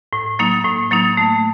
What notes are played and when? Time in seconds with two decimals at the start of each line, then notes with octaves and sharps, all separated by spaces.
0.13 A2
0.39 F#3 A#3 D#4
0.65 A2
0.91 F#3 A#3 D#4
1.17 A3